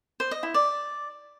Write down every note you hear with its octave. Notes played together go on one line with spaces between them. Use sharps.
C5
D#5
E4
D5